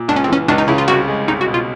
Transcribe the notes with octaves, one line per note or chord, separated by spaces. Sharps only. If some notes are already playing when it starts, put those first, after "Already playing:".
Already playing: A#2
C#2 D4
C#4
C4
E3 C#4
C#2 D4
D#4
C#3 E4
F4
C2 F#4
G#3
C2 D#4
F#4
B2
F4